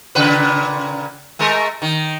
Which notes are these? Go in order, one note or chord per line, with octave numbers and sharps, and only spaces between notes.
A#2 C#3 B4
G#3 A3 A#4
D#3